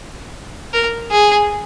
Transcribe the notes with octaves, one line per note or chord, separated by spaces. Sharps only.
A#4
G#4